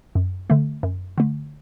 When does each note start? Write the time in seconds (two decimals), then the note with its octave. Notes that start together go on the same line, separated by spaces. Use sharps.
0.15 F#2
0.50 D3 A3
0.83 F#2
1.18 D3 A3